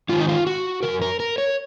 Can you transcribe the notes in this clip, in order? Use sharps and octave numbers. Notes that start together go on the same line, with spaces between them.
G#2 D#3 F4
D#4
F4
F#4
C#3 A#4
F#2
A#4
A#4
C#5